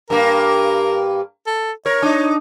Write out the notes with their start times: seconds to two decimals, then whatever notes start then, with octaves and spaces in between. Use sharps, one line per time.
0.10 G2 A#3 A#4
1.47 A4
1.86 A#4 C#5
2.02 D4 D#4